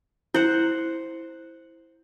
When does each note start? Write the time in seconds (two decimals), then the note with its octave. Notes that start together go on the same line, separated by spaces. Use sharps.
0.34 E4 C5 F#5